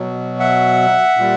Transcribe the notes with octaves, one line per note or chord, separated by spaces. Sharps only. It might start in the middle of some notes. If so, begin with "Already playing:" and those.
Already playing: B2 F#3
E5 F#5
A#2 G3